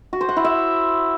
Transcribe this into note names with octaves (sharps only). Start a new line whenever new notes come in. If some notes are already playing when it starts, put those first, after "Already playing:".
F#4
C5
F#5
E4
E5